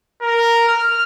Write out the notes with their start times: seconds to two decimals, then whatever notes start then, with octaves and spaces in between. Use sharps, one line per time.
0.22 A#4
0.68 F6